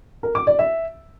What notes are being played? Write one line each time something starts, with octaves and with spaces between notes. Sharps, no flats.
A#4
D6
D5
E5